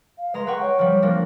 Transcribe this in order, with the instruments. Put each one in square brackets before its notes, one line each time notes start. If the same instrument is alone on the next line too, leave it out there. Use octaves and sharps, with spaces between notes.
[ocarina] F5
[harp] G#3 A#5 C6 [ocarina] B4
[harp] B4 G5 C#6 [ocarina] F#5
[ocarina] C#5
[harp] F3 G3
F3 A#3 D4